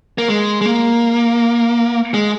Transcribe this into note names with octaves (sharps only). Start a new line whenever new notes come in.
A#3
G#3
G#3
A#3
G#3